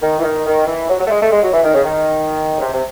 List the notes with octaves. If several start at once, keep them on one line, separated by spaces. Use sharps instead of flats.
D#3
E3
D#3
D#3
E3
F#3
F#3
A3
G#3
A3
G#3
F#3
E3
D#3
C#3
D#3
C#3
C3
C3